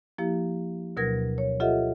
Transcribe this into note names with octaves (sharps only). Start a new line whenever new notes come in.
F3 A#3 E4 G4
D2 B2 F#3 A#4 G#6 A#6
C#5
F4 G4 A4 D#5 E5 F#5